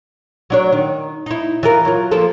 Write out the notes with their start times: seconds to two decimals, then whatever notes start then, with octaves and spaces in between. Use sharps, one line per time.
0.50 F#3 D4 C#5
0.72 D#3
1.26 D#4 E4
1.63 E3 F4 A#4
1.85 F#3 F4
2.12 F3 A#3 A4